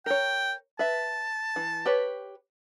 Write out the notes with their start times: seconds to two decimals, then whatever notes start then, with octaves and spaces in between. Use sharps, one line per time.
0.06 A#4 C#5 G5
0.79 B4 E5 A5
1.56 E3
1.85 G4 B4 C#5